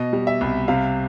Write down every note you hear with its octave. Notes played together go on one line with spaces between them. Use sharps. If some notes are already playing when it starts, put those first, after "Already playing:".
Already playing: B2 D#5
G3
E5
C2
C3 F5